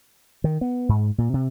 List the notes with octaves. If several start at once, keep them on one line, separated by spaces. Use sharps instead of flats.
D#3
B3
G#2
A#2
C3